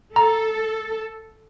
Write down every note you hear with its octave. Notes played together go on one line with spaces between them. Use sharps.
A4 A#5